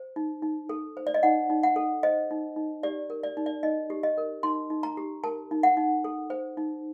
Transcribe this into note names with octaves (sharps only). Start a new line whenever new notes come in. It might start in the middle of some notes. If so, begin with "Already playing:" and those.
Already playing: C5
D#4
D#4
A4
C5
D5
D#5
D#4 F#5
D#4
F#5
A4
C5 D#5
D#4
D#4
G4 D5
A#4
D5
D#4
D5
D#4 D#5
G4
D#5
A#4
D#4 C6
D#4
A#5
G4
A#4 A5
D#4
F#5
D#4
A4
C5
D#4